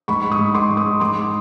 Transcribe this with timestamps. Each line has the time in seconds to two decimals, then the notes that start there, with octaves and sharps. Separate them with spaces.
0.08 G#2 B5 C#6
0.32 C#6 D#6
0.39 G#2
0.54 C6 D6
0.70 G#2
0.77 C#6 D#6
1.00 G#2 C6 D6